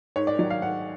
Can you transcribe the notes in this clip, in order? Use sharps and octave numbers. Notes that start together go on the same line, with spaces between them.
G#2 C#5
D5
D#3 F#3 D5
F5
G#2 F#5